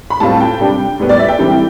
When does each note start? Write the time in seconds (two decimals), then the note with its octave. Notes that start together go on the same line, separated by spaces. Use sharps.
0.10 B5
0.20 A2 G3 C4 F4 A5
0.40 G5
0.60 C3 G3 D4
1.00 A2 G3 B3
1.09 D5
1.19 E5
1.28 G5
1.39 E3 G3 C4 E4